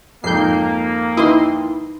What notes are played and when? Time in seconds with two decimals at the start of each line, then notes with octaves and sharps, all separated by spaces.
0.24 F2 G#2 A#3 G6 C7
1.17 D#4 E4 B4 C6 D#6